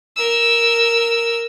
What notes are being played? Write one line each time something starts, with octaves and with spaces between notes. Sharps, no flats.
A#4 E6